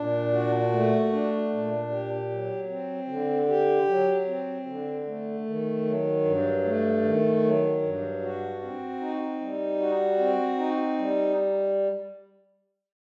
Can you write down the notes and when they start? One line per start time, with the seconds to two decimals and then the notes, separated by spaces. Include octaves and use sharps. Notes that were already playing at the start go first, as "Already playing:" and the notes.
Already playing: A#2 D4
0.33 F#4
0.72 A3
1.12 D4
1.51 A#2
1.90 G4
2.30 F#3
2.69 C4
3.08 D3
3.48 G4
3.88 F#3
4.28 C4
4.66 D3
5.06 A3
5.46 D#3
5.85 F#3
6.25 G2
6.64 A3
7.03 D#3
7.43 F#3
7.82 G2
8.22 F#4
8.61 C4
9.01 D#4
9.41 G3
9.80 F#4
10.19 C4
10.58 D#4
10.98 G3